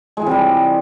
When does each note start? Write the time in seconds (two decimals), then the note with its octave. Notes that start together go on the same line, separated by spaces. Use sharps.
0.17 G#3
0.22 E3
0.26 C3
0.31 G3